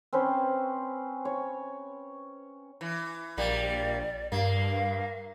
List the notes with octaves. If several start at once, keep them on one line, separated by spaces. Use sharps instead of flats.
C4 C#4 B4 C5
C#5
E3
A#1 G3 A#3 D5
G2 A#3 F5